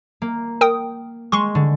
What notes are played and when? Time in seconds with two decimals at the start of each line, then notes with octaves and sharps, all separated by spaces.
0.22 A#3
0.61 A#4 G5 D#6
1.32 G#3 C6 C#6
1.55 D3